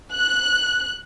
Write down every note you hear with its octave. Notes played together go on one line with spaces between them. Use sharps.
F#6